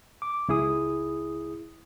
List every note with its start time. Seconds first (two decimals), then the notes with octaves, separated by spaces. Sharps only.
0.22 D6
0.48 C#2 E4 G#4 D#6